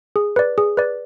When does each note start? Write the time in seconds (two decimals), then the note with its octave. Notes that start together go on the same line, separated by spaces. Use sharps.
0.16 G#4
0.36 B4 D5
0.58 G#4
0.77 B4 D5